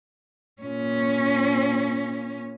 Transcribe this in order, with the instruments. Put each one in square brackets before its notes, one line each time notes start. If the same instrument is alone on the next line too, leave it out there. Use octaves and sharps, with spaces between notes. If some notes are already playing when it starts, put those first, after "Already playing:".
[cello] A#2 C#4